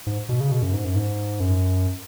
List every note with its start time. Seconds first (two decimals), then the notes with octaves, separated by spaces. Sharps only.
0.07 G#2
0.29 B2
0.40 C#3
0.52 B2
0.62 F#2
0.73 G#2
0.85 F#2
0.96 G#2
1.40 F#2